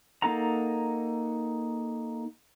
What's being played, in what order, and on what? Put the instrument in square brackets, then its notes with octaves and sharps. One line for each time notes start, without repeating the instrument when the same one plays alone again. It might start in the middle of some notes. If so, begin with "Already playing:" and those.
[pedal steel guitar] A#3 D#4 A4 F#5 A#5